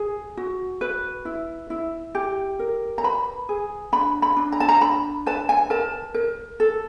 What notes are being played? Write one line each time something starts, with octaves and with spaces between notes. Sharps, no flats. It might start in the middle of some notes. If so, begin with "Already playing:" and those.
Already playing: G#4
F#4
B4
E4
E4
G4
A#4
A#5
B4 B5
G#4
D4 B5
B5
D4
A#5
A5
A#5
D4 B5
B4 A5
G#5
A#4 A5
A#4
A4